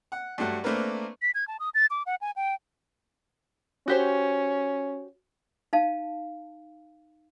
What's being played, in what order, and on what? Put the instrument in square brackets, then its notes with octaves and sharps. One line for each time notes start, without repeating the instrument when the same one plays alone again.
[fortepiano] F#5
G2 F#3 A3 F#5
A3 A#3 C4 D4 A#4 B4
[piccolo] B6
G#6
A5
D#6
A6
D6
F#5
G#5
G5
[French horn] C#4 [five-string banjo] F#4 G4 C5
[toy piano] D#4 F5 A5